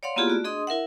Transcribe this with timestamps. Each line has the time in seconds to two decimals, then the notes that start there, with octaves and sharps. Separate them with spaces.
0.03 C#5 D5 F5 F#5 C6
0.16 A#3 B3 E4 F4 G4 G#4
0.28 A3 F#4 D5
0.44 D4 G#4 D#5 C6 D#6
0.67 E4 A#4 E5 F#5